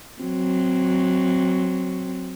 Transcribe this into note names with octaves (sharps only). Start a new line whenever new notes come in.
F#3 C4